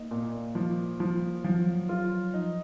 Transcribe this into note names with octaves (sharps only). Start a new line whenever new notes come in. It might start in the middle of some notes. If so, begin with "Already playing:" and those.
Already playing: A#3 D#4
A#2
F3
F3
F3 F#3
F4
F3 D#4